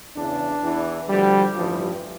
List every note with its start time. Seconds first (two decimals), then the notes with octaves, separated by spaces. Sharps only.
0.15 E2 C#3 E3 D4
0.62 E2 E3
1.08 D2 D3 F3 G3
1.55 A1 G2 E3 F3